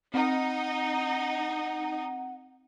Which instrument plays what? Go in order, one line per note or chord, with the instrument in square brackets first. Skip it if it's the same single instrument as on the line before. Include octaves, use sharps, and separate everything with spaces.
[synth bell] C4 [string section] D#4 [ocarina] F#5